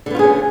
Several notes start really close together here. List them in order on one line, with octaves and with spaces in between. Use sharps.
D3 B3 F4 G#4 C#4